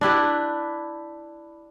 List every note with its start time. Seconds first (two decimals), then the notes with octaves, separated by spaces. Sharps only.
0.01 D4 E4 G4 B4